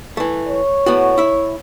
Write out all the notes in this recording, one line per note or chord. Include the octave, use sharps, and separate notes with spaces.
E3 A3
C#5
A2 B3 F#4
E4 E5